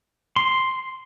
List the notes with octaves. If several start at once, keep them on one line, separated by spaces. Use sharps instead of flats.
C6